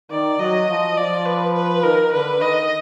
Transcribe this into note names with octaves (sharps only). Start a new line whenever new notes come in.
D#3 D5
F#3 D#5
F3
F3 D5
B4
B4
D#3 A#4
D3 B4
D#3 D#5